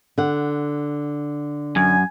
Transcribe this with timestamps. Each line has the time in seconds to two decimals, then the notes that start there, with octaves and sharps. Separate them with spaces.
0.18 D3 F#5
1.76 F#2 G#5